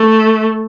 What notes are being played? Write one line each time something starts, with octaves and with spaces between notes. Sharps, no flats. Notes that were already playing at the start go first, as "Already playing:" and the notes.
Already playing: A3